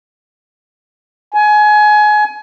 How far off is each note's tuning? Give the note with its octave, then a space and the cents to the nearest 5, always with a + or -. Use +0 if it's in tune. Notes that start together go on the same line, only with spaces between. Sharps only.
G#5 +25